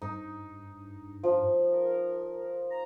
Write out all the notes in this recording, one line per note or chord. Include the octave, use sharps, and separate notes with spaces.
G2 D#4
F3
A#4
A#5